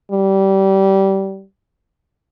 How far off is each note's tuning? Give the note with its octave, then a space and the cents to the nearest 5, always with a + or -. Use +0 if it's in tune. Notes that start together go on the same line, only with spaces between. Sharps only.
G3 -20